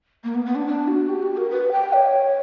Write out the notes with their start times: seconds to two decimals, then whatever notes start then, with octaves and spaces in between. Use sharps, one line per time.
0.24 A#3
0.35 B3
0.46 B3
0.55 D4
0.67 D4
0.87 F#4
1.09 G4
1.23 F#4
1.37 A#4
1.51 B4
1.72 G5
1.93 C#5